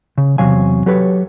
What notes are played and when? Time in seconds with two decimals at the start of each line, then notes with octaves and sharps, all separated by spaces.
0.18 C#3
0.38 E2 C3 F#3 F5 G#5
0.86 F#3 G4 A4 B4 C#5